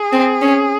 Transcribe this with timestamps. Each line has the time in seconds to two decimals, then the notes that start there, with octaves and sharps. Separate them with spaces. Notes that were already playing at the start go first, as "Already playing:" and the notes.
Already playing: G#4
0.12 C4
0.42 C#4